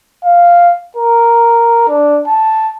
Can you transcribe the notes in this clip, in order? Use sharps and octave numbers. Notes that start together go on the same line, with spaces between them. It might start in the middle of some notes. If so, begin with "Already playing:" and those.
F5
A#4
D4
A5